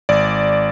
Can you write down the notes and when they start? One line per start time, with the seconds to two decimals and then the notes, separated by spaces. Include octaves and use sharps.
0.09 G#1 D5